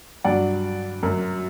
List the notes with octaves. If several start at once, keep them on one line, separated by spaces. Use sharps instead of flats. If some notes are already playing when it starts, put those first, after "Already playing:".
G2 F#3 D5 F#5
F#2 F#3